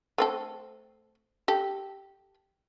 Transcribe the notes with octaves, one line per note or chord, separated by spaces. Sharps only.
A3 C4 A4
G4 A4